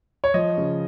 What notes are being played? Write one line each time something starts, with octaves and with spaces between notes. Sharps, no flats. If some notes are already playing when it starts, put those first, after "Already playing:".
C#5
F3 D#5
C#3